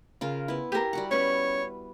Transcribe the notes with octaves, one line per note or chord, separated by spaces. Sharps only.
C#3 F4 A#4
B3 E4
G4 A#4 G#5 C6
G3 F#4 F#5
B3 C#4 B4 C#5 C#6